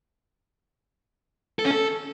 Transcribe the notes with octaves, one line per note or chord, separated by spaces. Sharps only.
A4
C#4
A4